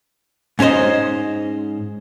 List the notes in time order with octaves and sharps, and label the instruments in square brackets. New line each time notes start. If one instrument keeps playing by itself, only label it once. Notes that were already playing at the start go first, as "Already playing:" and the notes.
[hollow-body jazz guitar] G#2 C#4 D4 C5 D#5